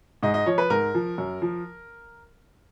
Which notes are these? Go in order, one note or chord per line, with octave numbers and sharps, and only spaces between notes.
G#2 D#5
D#5
F3 C#5
B4
G#2 A#4
F3
F#2
F3